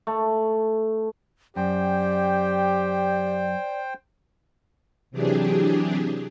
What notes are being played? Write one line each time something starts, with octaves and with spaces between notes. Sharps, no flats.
A3
F#2 G4 C5 D5 G5
C3 E3 F#3 D4 G4 G#4